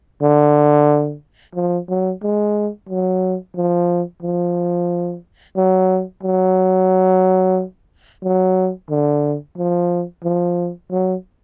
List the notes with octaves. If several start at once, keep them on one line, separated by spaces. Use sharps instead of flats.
D3
F3
F#3
G#3
F#3
F3
F3
F#3
F#3
F#3
D3
F3
F3
F#3